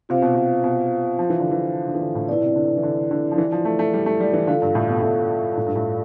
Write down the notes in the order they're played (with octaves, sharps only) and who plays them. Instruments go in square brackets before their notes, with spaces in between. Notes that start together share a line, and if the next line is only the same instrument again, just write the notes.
[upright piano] C3 [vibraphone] F4 C5 F5
[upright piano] B2
C3
B2
F3
E3
D3
E3
D3
E3
D3
A2
[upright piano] B2 [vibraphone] D5
[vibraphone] E4 B4
[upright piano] C3
D3
C3
E3
D3
D3
F3
E3
F3
A3
A3
G3
A3
G3
E3
[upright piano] D3 [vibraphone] F4 A4 D5 F5
[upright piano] G2
A2
B2
A2
A2
G2
A2